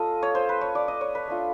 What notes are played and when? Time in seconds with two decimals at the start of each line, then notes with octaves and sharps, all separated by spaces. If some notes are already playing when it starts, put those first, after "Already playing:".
Already playing: A#3 C#4 F4 A4 D#5
0.23 C#5
0.35 C5
0.49 B4
0.61 C#5
0.75 D5
0.88 D#5
1.01 C#5
1.15 B4
1.28 A3 D4 F4